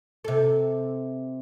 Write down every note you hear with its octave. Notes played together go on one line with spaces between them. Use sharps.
C3 A4